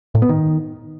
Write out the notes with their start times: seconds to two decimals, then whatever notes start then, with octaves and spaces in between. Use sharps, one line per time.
0.15 A2
0.22 B3
0.29 D#3